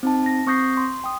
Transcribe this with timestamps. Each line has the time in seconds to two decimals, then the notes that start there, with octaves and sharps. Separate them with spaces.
0.03 C4 D#4 A5
0.26 A#6
0.47 C4 C#6 D#6 G6 A#6 C7
0.77 C6
1.04 G5 D#6